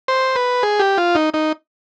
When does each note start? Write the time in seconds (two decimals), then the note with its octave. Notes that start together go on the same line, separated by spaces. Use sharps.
0.08 C5
0.36 B4
0.63 G#4
0.79 G4
0.98 F4
1.15 D#4
1.34 D#4